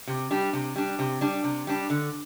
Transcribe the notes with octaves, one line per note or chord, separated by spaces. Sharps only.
C3
G3 D4
C3
G3 D4
C3
G3 D4
C3
G3 D4
D3